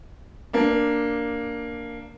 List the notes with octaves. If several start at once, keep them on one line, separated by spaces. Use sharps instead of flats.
A#3 D4